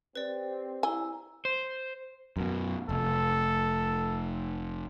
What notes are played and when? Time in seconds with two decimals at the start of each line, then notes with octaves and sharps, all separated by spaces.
0.15 C4 G4 B4 D5
0.83 E4 G#5 A#5
1.45 C5
2.37 F#2 B2
2.89 F1 A4